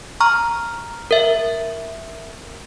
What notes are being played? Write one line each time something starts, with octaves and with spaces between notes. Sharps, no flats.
A#5 C#6 F6
A#4 E5